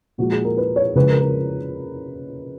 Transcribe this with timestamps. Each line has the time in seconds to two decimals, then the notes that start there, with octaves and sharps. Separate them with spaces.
0.18 A#2 F3 G#3 F#4
0.32 G#4
0.44 A#4
0.58 B4
0.76 C#5
0.95 C#3 F3 G#3 B4
1.09 A#4
1.21 A#4